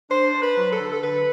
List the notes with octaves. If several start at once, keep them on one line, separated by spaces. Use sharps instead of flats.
D4 C5
D4
B4
F#3
A4
D3
A4
D3 B4